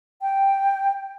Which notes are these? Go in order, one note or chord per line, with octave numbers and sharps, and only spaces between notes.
G5